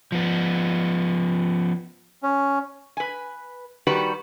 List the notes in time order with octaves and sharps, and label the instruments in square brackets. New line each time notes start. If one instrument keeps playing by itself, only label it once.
[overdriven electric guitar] F3 B3
[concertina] C#4
[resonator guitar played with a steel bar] B4 G#5
D#3 G3 F#4 G4 B4